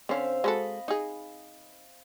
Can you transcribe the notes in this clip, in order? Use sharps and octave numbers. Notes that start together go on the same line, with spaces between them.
D3 C4 C#4 E5 F5
G#3 F#4 A4 D#5 B5
D#4 G#4